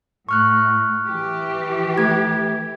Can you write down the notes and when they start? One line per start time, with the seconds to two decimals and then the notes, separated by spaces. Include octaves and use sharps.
0.29 A2 C#6 F6 F#6
1.06 E3 G4
1.98 A3 G#6